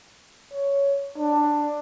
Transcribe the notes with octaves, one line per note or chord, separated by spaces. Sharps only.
C#5
D4